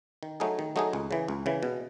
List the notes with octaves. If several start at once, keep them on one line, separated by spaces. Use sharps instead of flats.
D#3
F#3 A3 D#4 G#4
D#3
F#3 A3 D#4 G#4
C#2
C#3 E3
C#2
C#3 E3
B2